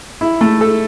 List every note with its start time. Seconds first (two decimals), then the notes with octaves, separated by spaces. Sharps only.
0.21 E4
0.41 A3
0.61 A4